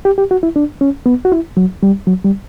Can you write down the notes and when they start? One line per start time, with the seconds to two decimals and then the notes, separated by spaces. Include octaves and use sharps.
0.05 G4
0.18 G4
0.31 F#4
0.43 E4
0.56 D4
0.81 C#4
1.06 B3
1.25 F#4
1.32 E4
1.57 F#3
1.83 G3
2.07 F#3
2.25 G3